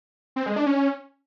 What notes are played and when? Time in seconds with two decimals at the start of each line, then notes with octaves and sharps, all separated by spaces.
0.36 C4
0.46 G#3
0.56 D4
0.66 C#4